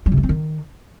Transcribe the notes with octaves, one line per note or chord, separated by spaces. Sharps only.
G3
C3
A3
C4
D#3